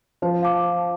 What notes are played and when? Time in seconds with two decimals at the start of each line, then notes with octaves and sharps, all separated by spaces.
0.22 F3 C5
0.43 F5 A5 D6
0.63 C5